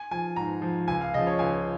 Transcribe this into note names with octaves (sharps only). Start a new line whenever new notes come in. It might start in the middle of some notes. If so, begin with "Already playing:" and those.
Already playing: G#5
F3 G#5
G#2 A#5
F3
C#2 G#5
F5
C#3 F3 D#5
C#5
C#2 G#5